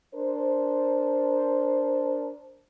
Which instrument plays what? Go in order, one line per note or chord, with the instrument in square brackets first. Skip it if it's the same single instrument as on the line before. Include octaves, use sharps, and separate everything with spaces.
[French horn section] D4 A#4 C5